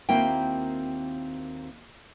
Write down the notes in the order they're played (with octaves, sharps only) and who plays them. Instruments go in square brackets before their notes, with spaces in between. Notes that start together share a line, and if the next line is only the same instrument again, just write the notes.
[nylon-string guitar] D#2 A#3 C4 E4 F#4 G5